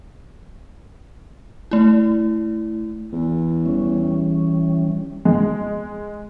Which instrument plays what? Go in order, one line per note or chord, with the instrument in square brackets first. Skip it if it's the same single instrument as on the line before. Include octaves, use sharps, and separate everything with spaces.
[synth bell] A3 E4
[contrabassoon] E2
[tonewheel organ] E3 G3 C#4
[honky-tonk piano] G#3